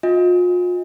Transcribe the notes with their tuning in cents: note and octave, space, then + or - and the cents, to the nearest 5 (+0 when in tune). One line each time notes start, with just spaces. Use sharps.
F4 +40 D#5 +30 G#5 -30